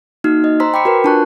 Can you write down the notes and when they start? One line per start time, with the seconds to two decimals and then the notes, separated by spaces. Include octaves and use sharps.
0.24 A#3 D#4 F#4 F6
0.44 D#5
0.60 C5 A#5 C6 E6 B6
0.74 G5 B5 D6 B6 C#7
0.85 F#4 A#4 B4
1.04 D4 F4 A5 C#6 F#6